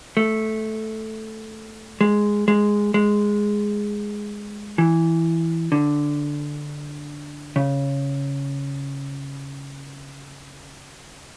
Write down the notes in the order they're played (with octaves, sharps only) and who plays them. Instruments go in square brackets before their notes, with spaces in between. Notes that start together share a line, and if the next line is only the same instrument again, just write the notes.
[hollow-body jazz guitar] A3
G#3
G#3
G#3
E3
D3
C#3